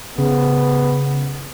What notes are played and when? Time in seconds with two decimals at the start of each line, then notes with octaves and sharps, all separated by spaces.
0.18 C#3 B3